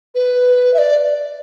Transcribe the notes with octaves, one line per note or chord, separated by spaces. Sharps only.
B4
E5
D5